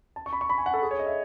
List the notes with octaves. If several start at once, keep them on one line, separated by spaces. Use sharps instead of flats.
A5
C#6
B5
C#6
B5
G#5
F#5
A4
G#4
C#5
D#5
E5